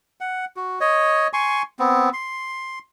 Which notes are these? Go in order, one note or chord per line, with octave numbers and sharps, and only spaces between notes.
F#5
F#4
C#5 D#5
G#5 C6 C#6
B3 C4
C6